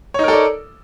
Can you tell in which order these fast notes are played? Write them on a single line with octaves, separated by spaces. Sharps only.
C#5 D#4 A#4 A4 D5